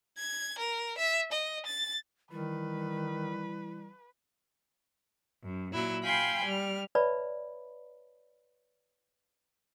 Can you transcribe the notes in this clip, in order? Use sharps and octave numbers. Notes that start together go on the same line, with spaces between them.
G#6
A#4
E5
D#5
A6
D#3 E3 G3 B4
F#2
A#2 F#3 E4
F5 G5 G#5 B5 C6 G6
G3 F6
B4 C#5 D5 E5 A5 B5